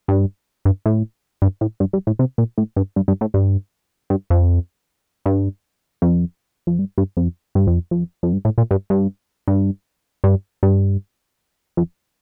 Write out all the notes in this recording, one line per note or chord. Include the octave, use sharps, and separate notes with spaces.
G2
G2
A2
G2
A2
G2
G2
A2
C3
A#2
A2
G2
G2
G2
A2
G2
G2
F2
G2
F2
F2
G2
G2
F2
G2
F2
F2
F2
G2
A2
A#2
G2
G2
G2
G2
G2
F2